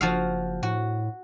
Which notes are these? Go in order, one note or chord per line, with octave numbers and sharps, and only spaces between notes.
F#1 F3 F#4 F5
A2 F#4